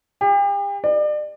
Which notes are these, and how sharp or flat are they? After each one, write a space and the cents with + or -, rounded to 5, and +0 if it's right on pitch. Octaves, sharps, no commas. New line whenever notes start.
G4 +40
D5 +35